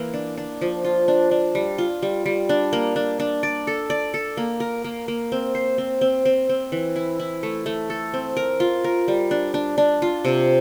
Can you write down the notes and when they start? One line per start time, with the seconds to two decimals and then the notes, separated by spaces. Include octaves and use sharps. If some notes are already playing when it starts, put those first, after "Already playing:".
Already playing: E3 A#3 E4
0.14 D4
0.38 D4
0.61 F3
0.85 F4
1.08 D4
1.31 D4
1.55 G3
1.78 F4
2.03 G3
2.26 G3
2.49 D4
2.73 A#3
2.96 D4
3.20 D4
3.43 D5
3.67 A4
3.90 D5
4.14 A4
4.37 A#3
4.60 A#4
4.84 A#3
5.08 A#3
5.32 C4
5.55 C5
5.78 C4
6.01 C4
6.25 C4
6.49 C4
6.72 E3
6.96 E4
7.20 E4
7.43 A3
7.66 A3
7.90 A4
8.14 C4
8.37 A#4
8.60 F4
8.84 A#4
9.08 G3
9.31 D4
9.54 D4
9.78 D4
10.02 F4
10.25 C3